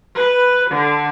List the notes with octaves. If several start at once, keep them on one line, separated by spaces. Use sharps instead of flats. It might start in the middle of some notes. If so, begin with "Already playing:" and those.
B4
D3